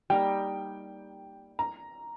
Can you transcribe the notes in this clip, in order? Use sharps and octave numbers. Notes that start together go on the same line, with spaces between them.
G3 A#3 D#4 A#4 G5
A#5